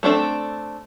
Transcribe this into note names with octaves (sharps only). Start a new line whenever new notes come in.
A3 C4 D4 A4